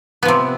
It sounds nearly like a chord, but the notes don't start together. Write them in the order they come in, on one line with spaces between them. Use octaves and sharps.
B3 F3 C3